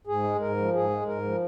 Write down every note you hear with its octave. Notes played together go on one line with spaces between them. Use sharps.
G#2 G#4
G#3
G#2 A#4
F3
G#2 G#4
G#3
G#2 A#4
F3